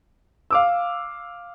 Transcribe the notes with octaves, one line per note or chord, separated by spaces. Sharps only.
F5 D6 E6